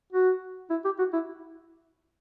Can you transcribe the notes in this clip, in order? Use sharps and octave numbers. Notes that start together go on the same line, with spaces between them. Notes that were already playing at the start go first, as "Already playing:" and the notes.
F#4
E4
G4
F#4
E4